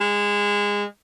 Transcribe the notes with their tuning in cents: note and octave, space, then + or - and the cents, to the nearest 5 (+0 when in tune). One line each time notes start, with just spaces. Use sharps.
G#3 -20